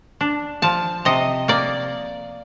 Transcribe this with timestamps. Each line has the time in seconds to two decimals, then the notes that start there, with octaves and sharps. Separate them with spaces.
0.21 D4
0.62 F3 A5
1.05 C3 D#5
1.48 A#3 D5